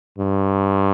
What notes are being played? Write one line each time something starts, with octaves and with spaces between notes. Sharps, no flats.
G2